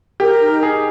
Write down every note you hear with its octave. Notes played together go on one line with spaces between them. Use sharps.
G4 A#4
D#4
D#4 G#4